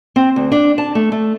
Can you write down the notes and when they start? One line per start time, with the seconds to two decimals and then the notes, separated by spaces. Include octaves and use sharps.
0.16 C4
0.36 D2
0.52 D4
0.78 A5
0.95 A3
1.12 A3